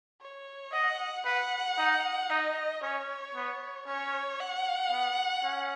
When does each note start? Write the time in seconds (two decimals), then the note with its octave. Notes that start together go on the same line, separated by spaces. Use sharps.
0.21 C#5
0.73 D#5 F#5
1.25 B4 F#5
1.78 D#4
2.30 D#4 D#5
2.82 C#4 C#5
3.35 B3
3.86 C#4 C#5
4.40 F#5
4.91 B3
5.44 C#4